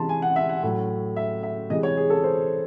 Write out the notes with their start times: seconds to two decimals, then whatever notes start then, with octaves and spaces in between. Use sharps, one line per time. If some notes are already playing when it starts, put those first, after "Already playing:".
Already playing: C3 E3 G#3 A5 C6
0.09 G#5
0.22 F#5
0.36 E5
0.49 F#5
0.63 A2 F#3
1.16 E5
1.43 E5
1.70 C3 E3 G#3 D#5
1.83 C#5
1.97 G#4
2.10 A4
2.24 C5